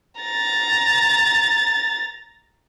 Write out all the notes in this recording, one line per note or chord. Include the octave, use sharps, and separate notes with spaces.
A#5 A6